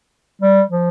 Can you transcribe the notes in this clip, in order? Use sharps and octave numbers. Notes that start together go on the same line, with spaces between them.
G3
F3